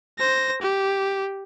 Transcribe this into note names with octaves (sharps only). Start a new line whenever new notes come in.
C5 A#6
G4